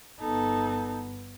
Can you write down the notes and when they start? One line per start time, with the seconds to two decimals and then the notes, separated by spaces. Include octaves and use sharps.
0.21 G1 B3 D#4 A4